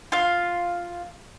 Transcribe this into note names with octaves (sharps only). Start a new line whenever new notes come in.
F4 F5